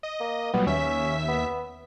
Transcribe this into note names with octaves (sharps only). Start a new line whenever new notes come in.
D#5
A#3
A#2 F#3 G3 B3
D#2 C#4 E5 B6
B3